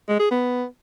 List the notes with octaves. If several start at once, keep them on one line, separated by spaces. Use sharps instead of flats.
G#3
G#4
B3